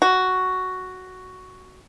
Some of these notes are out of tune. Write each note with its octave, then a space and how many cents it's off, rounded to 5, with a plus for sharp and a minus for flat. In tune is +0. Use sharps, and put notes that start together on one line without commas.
F#4 +5